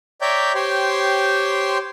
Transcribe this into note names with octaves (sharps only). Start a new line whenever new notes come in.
C#5 D5 E5 G5 A#5 G6
G4 C5 C#5 G5 C6